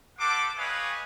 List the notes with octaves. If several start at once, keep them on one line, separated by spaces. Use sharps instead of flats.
G4 A4 C5 F#5 D6
G4 B4 C#5 D#5 F5 G#5